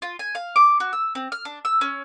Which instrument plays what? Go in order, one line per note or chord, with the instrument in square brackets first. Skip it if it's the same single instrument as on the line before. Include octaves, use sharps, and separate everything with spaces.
[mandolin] F4
G#5
F5
D6
F#4
E6
C4
F6
D4
E6
C#4